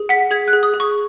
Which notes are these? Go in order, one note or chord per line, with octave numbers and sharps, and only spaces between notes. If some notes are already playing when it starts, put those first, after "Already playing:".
Already playing: G#4
F#5 B6
G#4 G#6
F#6
G#4
D#6
G#4
C#6